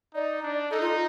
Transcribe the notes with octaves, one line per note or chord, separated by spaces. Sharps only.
D#4 D5
D4
D#4 A4
F4